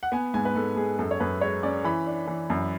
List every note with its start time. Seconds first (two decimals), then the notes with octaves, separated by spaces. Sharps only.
0.03 F#5
0.12 B3 G#5
0.34 G#2 G#5
0.45 B4
0.55 G#2 A4
0.77 G#2 G#4
0.99 F#2 A4
1.11 C#5
1.20 F#2 B4
1.41 G#3 C#5
1.63 C#4 D5
1.84 E3 B5
2.06 D4
2.27 E3
2.50 F#2